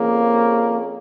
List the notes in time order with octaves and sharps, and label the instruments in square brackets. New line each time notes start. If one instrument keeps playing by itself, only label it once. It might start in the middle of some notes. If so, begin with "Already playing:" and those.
Already playing: [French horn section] F2 F3 C#4 G#4 C#5 [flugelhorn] A#3